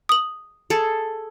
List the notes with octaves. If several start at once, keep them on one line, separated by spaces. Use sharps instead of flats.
D#6 F#7
G#4 A4